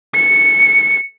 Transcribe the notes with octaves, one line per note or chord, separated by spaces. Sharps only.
C#7